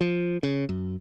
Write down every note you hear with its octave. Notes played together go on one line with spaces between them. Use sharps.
F3
C#3
F#2